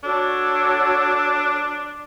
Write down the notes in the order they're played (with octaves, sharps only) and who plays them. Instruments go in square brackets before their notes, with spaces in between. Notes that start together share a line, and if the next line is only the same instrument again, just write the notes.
[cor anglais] D4 [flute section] F#4 A4 C#5